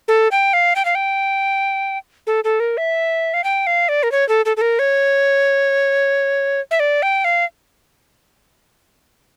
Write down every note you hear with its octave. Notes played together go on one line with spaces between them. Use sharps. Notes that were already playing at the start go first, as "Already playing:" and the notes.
A4
G5
F5
G5
F5
G5
A4
A4
A#4
E5
F5
G5
F5
D5
A#4
C#5
A4
A4
A4
A#4
C#5
E5
D5
G5
F5